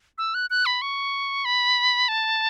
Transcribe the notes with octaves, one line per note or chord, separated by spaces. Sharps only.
E6
F#6
F#6
B5
C#6
B5
A5